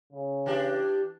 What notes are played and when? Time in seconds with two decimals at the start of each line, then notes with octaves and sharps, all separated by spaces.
0.12 C#3
0.46 E3 D4 G4